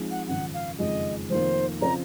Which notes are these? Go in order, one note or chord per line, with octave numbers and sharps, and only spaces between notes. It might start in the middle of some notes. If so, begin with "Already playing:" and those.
Already playing: F3 G#3 C4 D#4
F#5
G#1 F#2 C#3 F3 F#5
F5
F#1 F2 D#3 G#3 D#5
F1 F2 D#3 A#3 C5
C#3 F3 C4 F4 C5 A#5